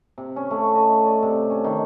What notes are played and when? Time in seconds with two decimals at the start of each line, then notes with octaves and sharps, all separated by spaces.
0.18 C3
0.36 C#4
0.51 A3
0.75 D#5
1.06 D5
1.23 C3
1.50 C#4
1.64 D#3